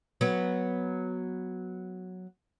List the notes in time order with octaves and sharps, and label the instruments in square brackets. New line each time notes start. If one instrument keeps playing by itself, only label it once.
[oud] F#3 B3